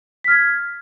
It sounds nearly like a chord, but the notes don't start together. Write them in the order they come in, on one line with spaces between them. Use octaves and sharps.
B6 F6 G#6